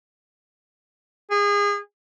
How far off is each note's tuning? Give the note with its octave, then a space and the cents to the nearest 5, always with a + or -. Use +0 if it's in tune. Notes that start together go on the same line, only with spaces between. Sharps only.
G#4 -30